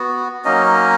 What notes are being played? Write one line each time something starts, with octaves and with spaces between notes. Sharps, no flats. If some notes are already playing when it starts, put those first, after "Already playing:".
Already playing: B3 F#4
F#3 A#3 C#4 D#4 D#5